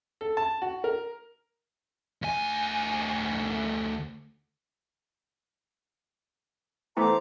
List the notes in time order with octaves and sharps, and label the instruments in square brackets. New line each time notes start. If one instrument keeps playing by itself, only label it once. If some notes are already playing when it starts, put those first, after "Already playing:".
[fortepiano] A4
A5
F#4
A#4
[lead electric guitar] D2 G#5
[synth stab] E3 A3 B3 [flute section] C5 A#5 D6